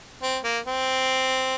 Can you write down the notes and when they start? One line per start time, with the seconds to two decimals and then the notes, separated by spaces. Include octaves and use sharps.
0.23 C4
0.44 A#3
0.66 C4